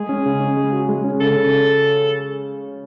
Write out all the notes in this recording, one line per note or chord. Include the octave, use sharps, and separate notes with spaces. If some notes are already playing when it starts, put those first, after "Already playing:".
Already playing: G#3 G#4
C#4
C#3
C#4
G#3
F#4
G#3
C#4
C#3 A4
C#3